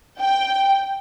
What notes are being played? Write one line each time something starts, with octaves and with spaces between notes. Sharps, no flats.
G5